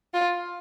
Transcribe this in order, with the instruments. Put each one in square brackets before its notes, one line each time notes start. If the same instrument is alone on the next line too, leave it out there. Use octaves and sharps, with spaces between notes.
[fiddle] F4